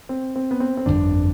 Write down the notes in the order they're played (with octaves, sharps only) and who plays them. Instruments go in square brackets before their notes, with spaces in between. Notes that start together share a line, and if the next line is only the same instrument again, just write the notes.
[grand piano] C4
C4
B3
C4
C4
[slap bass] G1 F2 D3 G3 [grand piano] D4